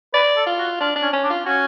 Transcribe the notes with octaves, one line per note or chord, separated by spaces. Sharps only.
B4 D5
A4
F4
F#4
D4 F4
D4
C#4
C#4
D4
F4
C#4 F#4